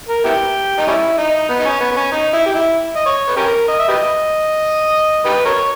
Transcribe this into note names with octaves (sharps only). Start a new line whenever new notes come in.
A#4
B3 E4 G4
D#4
G3 C#4 E4
D#4
B3
D#4
C#4
B3
B3
C#4
D#4
E4
G4
E4
D#5
C#5
B4
C#4 G4 A#4
D#5
E5
G4 B4 D#5
D#4 G4 B4
A#4 C#5